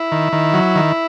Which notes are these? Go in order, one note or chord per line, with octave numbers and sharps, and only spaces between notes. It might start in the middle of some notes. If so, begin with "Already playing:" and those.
Already playing: E4
D#3
D#3
F#3
D#3